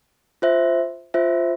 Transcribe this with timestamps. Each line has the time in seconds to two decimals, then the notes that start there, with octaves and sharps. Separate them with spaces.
0.42 F4 C5 E5
1.14 F4 C5 E5